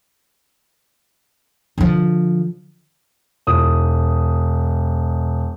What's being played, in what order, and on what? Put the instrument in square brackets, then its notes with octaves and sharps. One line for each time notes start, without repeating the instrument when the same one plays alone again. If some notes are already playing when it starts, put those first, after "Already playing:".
[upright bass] D3 F3
[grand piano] E1 D#6